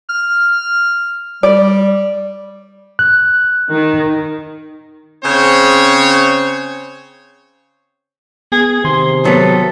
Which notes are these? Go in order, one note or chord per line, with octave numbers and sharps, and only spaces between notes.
F6
G3 D5
F#6
D#3
C#3 C4 G#4 C5 C#5
B3 G#4
C3 D#3 C6
F#3 B3 A4